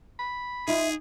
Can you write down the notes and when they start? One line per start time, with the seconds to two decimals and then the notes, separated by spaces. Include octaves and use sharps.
0.19 B5
0.68 D#4 F4 G#4 E5